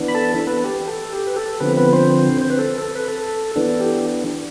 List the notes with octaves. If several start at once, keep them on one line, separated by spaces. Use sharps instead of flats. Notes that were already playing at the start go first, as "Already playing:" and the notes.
Already playing: E3 B3 D4
B5
A4 A5
A4
B3 B4
G4
A4
G4
B4
A4
D3 F3 B3 C4 B4
B3 B4
C4 C5
C5
B4
A4
A4
B4
A4
E3 B3 D4 A4
G4